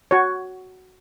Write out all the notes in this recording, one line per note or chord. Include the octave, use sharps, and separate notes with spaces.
F#4 C#5